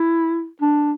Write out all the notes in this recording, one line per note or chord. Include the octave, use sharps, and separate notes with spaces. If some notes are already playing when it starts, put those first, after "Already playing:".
Already playing: E4
D4